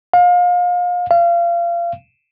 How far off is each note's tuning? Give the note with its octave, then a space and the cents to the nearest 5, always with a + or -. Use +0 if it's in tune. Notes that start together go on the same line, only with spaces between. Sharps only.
F5 +30
F5 -30